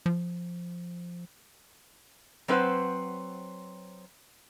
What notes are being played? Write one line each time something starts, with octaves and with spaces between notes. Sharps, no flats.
F3
F#3 C4 B4 C5 F#5